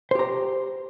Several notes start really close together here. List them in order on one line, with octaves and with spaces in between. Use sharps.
C5 G4 A#5